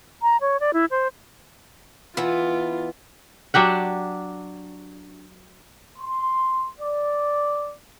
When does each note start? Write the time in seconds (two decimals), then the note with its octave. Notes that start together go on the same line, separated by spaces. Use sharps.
0.22 A#5
0.41 C#5
0.60 D5
0.74 E4
0.91 C5
2.17 E3 B3 F4
3.54 F#3 D4 G4 F#5
5.98 C6
6.78 D5